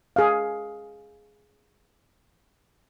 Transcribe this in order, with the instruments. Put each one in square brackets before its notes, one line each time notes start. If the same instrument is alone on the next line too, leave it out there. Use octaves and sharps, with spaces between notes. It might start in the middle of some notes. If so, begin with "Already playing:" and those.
[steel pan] G#4 F5